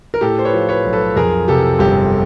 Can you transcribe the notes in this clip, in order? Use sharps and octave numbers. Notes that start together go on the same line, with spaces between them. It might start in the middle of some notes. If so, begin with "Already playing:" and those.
A#4
A2 G4 A4
C5
B4 C#5
F3
B4 C#5
B1
A4 B4
F2 G#4 A#4
C3 G4 A4
G1 G4